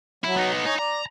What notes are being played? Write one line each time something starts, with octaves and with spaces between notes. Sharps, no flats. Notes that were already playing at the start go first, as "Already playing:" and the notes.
F#3 E4
B3 D#4
D#4 C#5 D#5 G#5
D5 A#5